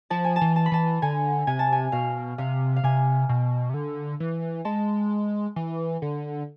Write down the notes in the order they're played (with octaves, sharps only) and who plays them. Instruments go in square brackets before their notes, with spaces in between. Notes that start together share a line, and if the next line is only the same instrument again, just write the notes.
[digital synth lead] F3 [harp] A5
[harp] G#5
A5
[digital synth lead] E3
[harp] A5
B5
[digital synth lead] E3 [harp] A5
[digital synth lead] D3 [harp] G#5
[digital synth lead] C3 [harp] G#5
[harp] A5
G#5
[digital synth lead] B2 [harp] F5
[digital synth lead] C3 [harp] F5
[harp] F5
[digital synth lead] C3 [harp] G#5
[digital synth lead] B2
C3
D3
E3
[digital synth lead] G#3 [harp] A5
[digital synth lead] E3
D3